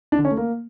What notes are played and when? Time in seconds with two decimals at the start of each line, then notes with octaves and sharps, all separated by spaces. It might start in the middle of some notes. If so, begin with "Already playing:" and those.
0.12 D4
0.18 D3
0.25 C#4
0.31 A3
0.37 A#3